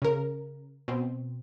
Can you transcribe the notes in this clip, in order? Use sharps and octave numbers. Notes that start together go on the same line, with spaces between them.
C#3 A#4
B2 C4